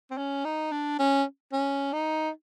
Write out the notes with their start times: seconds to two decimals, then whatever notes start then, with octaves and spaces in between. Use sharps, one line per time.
0.11 C4
0.18 C#4
0.45 D#4
0.72 D4
0.99 C#4
1.53 C#4
1.93 D#4